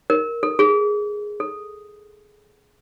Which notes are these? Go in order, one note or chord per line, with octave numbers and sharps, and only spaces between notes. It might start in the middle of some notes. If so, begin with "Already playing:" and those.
A#4
A4
G#4
A4